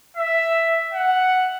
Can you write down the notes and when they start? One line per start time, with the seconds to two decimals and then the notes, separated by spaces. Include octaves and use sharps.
0.17 E5
0.93 F#5